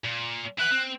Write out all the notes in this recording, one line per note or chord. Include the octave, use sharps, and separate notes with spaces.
A#2
E4 B4 F#6
C4